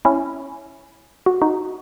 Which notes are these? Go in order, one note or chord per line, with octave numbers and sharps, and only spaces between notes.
C#4 E4
F#4
D#4 F#4